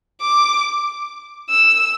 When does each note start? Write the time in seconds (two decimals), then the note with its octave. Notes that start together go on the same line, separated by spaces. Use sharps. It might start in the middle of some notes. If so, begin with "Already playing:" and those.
0.21 D6
1.50 E6